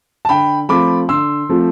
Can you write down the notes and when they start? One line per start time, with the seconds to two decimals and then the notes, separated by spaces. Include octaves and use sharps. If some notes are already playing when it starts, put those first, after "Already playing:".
0.25 A5
0.29 D3 G5 B5
0.69 F3 A3 C4 F4 B5 D6
1.09 D3 C6 E6
1.49 F3 A3 C4 F4